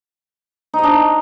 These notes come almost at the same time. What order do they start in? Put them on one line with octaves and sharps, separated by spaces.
D#4 D#5 D4